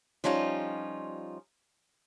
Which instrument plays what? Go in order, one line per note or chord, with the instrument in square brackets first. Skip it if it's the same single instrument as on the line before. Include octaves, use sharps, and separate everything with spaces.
[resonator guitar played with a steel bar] F3 G3 C#4 D#4 F4